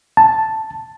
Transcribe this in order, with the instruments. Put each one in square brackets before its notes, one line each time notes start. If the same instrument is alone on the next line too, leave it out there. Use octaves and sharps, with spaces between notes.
[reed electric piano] A5